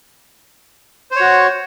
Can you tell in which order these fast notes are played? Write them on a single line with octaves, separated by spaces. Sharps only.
C5 C#5 F#4